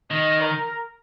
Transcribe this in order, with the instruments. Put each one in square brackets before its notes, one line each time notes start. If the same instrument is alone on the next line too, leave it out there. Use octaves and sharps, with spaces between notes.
[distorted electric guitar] D#3 [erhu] D#5
[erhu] A#4